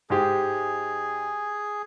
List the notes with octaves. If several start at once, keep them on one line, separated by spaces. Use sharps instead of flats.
G#2 G#3 G4 G#4